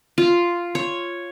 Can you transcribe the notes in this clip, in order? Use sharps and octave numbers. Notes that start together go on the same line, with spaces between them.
F4
C#5